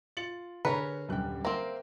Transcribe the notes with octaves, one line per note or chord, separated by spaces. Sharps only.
F4 A6 C#7 F#7
D3 G#4 A#4 B4 C#5 B6 C#7
D#1 F#2 D3 G3 G5 F#6
A#3 C4 A#4 C5 E5